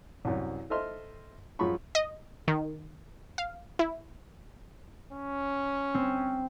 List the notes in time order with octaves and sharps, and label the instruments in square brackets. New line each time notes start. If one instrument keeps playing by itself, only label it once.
[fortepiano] C2 F#2
A4 C5 D#5 E5 C6 F6
F#2 F3 G#3 F4 B5 C#6
[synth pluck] D#5
D#3
F5
E4
[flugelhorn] C#4
[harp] C4